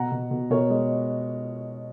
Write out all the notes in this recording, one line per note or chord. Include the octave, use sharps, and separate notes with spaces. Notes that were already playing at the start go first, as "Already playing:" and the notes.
Already playing: B2 F#5 A#5
B2
B2
B2 A#4 C#5
G#3